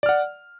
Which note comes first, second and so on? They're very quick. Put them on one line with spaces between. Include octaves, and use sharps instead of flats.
D5 F6 F#5